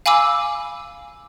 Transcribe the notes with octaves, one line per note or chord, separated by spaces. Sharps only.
F5 G#5 B5 D6 E6